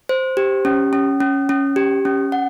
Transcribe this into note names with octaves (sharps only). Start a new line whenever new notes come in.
C5
G4
C#4
C#4
C#4
C#4
G4
C#4
F#5